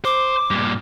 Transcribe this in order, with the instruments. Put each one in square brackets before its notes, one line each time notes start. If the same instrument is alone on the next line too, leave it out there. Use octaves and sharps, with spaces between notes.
[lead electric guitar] C5 [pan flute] D6
[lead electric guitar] G2 A#2